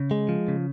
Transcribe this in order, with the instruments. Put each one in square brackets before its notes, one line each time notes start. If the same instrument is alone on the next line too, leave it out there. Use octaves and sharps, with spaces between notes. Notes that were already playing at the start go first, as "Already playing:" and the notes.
Already playing: [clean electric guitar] C#3
G#3
F3
C#3